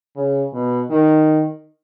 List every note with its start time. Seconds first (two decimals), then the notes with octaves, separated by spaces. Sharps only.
0.16 C#3
0.53 B2
0.91 D#3